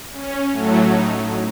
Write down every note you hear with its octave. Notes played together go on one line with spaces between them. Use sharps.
C#4
A2 F#3 A3
D#4